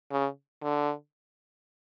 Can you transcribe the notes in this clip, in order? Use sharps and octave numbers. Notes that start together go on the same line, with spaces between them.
C#3
D3